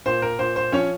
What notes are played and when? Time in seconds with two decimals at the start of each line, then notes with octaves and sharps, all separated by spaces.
0.06 A#2 C5
0.22 A#4
0.39 A#2 C5
0.56 C5
0.72 F3 C#4 C#5